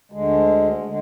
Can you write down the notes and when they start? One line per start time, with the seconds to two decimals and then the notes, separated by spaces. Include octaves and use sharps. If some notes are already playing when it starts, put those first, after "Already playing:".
0.12 D2 D3 G#3
0.84 D3 G#3